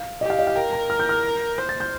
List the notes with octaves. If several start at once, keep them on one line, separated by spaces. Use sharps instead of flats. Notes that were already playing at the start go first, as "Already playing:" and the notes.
Already playing: F5
G4 D#5
F5
D#5
F5
A#4 G5
A#5
F6
G6
F6
C5 G6
A6
G6